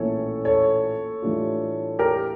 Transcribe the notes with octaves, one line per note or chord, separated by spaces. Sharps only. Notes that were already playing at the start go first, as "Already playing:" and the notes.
Already playing: A#1 A2 E3 A#3 C#4 A4 C#5
A4 C#5
A2 E3 G3 D4 F4
G4 A#4